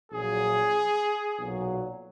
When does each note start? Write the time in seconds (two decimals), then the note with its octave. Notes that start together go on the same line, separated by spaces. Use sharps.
0.12 A#1 A#2 F#3 G#4
1.37 B1 A#2 F#3